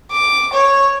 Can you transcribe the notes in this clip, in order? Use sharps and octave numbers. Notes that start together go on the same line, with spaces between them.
D6
C#5